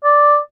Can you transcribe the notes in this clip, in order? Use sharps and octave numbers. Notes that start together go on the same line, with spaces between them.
D5